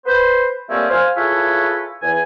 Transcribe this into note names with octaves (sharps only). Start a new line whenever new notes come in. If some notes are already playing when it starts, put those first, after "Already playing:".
B4 C5
G3 A3 A#3 C4 C#4
C5 F5 G#5
E4 F4 G#4 A4 B4 C#5
E2 G#5